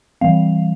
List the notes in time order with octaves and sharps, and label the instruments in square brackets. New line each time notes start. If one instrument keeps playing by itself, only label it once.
[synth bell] E3 G3 C4 F5